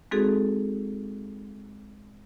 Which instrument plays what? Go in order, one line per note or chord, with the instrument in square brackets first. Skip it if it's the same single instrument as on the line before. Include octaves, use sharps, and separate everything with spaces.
[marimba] G#3 C4 D#4 F#4 G#4 A4